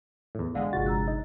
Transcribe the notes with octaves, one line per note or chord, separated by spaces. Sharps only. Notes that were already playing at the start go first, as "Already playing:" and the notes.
E2 A2
A#1 D3 G#3 D5 F5 F#5
G1 C3 F4 F#4 A6
A#5 E6 F#6
D#4